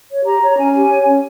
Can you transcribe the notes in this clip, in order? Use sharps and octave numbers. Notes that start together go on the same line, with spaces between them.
C#5
G4 A#5
C#5
A#5
C#4 G#5
G4
C#5
C#4